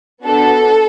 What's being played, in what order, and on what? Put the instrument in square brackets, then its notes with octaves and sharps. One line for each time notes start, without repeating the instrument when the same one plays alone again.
[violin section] B3 D4 F#4 A4